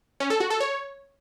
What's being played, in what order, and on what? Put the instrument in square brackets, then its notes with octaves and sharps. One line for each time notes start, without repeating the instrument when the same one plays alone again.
[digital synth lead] C#4
A4
F#4
A4
C#5